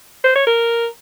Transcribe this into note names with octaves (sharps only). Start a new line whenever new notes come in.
C5
C#5
A#4